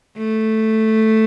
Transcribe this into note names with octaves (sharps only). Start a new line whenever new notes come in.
A3